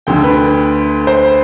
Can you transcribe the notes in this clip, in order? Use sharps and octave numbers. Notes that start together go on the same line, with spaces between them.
D2 D3 G5
B4
C5